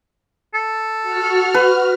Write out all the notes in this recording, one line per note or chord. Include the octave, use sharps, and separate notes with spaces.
A4
F#4 F6
B4